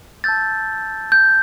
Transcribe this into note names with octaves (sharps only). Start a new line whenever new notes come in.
A5 E6 G6 A6
G6